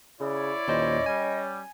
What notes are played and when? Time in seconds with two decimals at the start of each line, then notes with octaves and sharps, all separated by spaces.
0.20 C#3 E4 C#5 D5
0.68 D#2 A#2 C#4 C5 D#5
1.06 G3 G#5